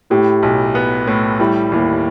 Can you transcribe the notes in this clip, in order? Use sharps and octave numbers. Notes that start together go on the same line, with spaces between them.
A2 E4 G4
B1
B3
A2
G3 E4
D#2 E4